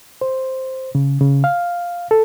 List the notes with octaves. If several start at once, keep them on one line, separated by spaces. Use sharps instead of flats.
C5
C#3
C#3
F5
A4